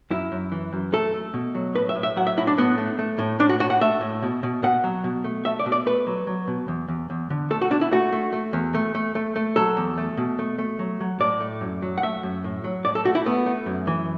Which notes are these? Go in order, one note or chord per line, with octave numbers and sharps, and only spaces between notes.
F#2 E4
F#2
E3
F#2
A3 A4
A3
B2
F#3
A2 B4
E5
A2
E5
F#3 F#5
E5
A2 E4
D4
A2 B3
A3
A3
A2
A2 D4
F#4
A2 F#4
F#5
A3 E5
A2
B2
B2
B2 F#5
F#3
B2
A3
A3 E5
D5
B2
D5
A3 B4
F#3
F#3
B2
E2
E2
E2
D3
A3 A4
F#4
B2 D4
E4
A3 F#4
A3
A3
E2
A3
A3
A3
A3
F#3 A4
E2
A3
B2
A3
A3
F#3
F#3
A2 D5
A3
F#2
F#3
F#5
A3 E5
F#2
A2
F#3
A2 D5
A4
A3 F#4
E4
A3 B3
A3
F#2
E3